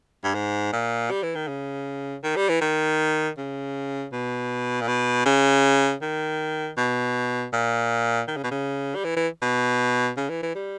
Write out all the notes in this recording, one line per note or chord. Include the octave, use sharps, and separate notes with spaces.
G2
G#2
A#2
G3
E3
D#3
C#3
D#3
G3
E3
D#3
C#3
B2
A#2
B2
C#3
D#3
B2
A#2
D#3
C#3
B2
C#3
G3
E3
E3
B2
C#3
E3
E3
G3